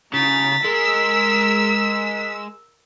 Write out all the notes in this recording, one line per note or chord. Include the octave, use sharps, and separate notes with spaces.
C#3 A#5 A6 B6
G#3 A#4 E6